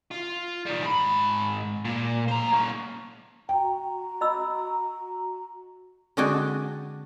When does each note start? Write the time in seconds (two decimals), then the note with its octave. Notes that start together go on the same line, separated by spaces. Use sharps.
0.11 F4
0.66 D#3 G3
0.82 G#2 B5
1.85 A#2
2.28 C5 A#5
2.53 A#3 C#4
3.49 F#4 G5 A#5
4.21 D#5 B5 E6
6.17 D3 G#3 D4 F#4 G5 G#5